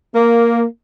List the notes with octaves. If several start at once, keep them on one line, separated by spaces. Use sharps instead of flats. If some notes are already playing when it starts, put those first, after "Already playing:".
A#3